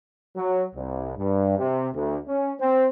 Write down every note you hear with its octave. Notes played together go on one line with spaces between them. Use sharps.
F#3
C2
G2
C3
D2
C#4
C4